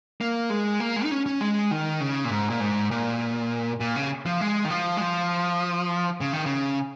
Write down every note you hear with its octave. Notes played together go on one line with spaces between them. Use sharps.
A#3
G#3
A#3
G#3
D#4
C#4
C#4
G#3
D#3
C#3
A#2
G#2
A#2
G#2
A#2
A#2
C#3
F3
G#3
D#3
F3
G#3
F3
C#3
D#3
C#3